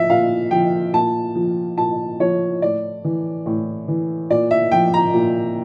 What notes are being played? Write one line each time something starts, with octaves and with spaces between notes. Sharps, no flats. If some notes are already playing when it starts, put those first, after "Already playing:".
Already playing: F3 E5
A#2 F5
F3 G5
A#2 A5
F3
A#2 A5
F3 C#5
A2 D5
E3
A2
E3
A#2 D5
E5
F3 G5
A#5
A#2